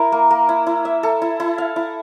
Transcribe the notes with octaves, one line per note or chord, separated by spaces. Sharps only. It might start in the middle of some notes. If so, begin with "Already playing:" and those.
Already playing: E4 A#4
A#3
A#3
E4
E4
E5
A4
E4
E4
F5
E4